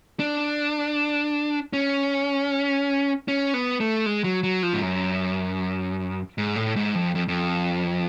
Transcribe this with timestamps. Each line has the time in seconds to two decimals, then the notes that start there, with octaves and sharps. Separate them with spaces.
0.19 D4
1.73 C#4
3.28 C#4
3.54 B3
3.80 A3
4.06 G#3
4.24 F#3
4.43 F#3
4.63 F3
4.73 G#2
4.82 F#2
6.38 G#2
6.56 A2
6.76 G#2
6.95 F2
7.15 F2
7.28 F2